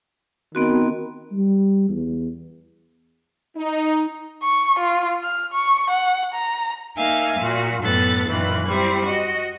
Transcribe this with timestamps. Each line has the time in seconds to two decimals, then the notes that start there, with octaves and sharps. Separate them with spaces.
0.55 D#3 B3 C4 F#4
1.32 G3
1.89 E2
3.56 D#4
4.43 C#6
4.79 F4
5.23 F6
5.53 C#6
5.90 F#5
6.34 A#5
6.96 A#3 D#4 E5 F5 G#5
7.39 A#2 F#4
7.83 F#2 A2 B3 A4 F#6 A6
8.30 F#2 A#2 D#3 E3 F#6
8.67 G3 C4 E4
9.05 F#4 D#5